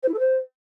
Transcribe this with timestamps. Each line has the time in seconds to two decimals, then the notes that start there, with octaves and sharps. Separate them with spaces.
0.03 C5
0.08 E4
0.14 A4
0.19 C5